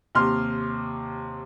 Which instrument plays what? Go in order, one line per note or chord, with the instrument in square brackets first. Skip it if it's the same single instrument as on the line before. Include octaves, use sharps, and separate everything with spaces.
[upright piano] D#2 C3 C6 F6